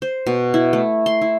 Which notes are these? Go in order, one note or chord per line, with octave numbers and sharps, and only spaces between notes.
C5
B2
E4
A3
C6
E4